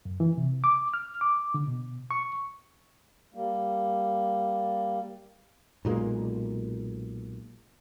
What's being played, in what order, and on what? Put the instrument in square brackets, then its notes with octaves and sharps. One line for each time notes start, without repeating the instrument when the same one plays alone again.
[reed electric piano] F#2
E3
C3
D6
F6
D6
D3
B2
C#6
[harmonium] G3 A#3
[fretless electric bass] B1 A#2 G#3 A#3